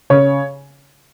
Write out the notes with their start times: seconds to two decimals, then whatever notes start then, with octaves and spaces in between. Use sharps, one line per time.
0.10 C#3 C#5